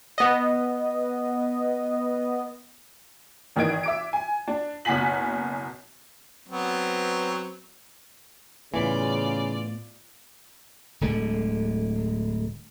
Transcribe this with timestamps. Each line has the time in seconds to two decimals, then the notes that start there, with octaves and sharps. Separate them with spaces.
0.18 B3 D#5
3.56 G#1 D#3 E3 D#5 G#6 D7
3.83 E5 D6 D7
4.13 G#5
4.48 D4
4.85 F#1 B2 F#5 G#5 B6 F#7
6.48 F#3 B3 C4
8.74 A2 C#3 E3 B3 F4 D5
11.01 D1 D3 G#3